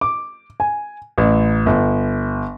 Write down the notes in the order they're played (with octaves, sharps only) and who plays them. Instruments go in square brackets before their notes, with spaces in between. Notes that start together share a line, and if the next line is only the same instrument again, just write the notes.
[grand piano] D6
G#5
A1
G1